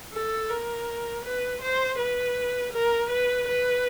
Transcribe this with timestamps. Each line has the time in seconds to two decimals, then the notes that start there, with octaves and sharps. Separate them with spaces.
0.13 A4
0.49 A#4
1.24 B4
1.61 C5
1.99 B4
2.72 A#4
3.10 B4
3.48 B4